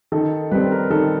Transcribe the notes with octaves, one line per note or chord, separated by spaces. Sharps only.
D#3 A4
G3 C4 B4
A#4
D#3 A4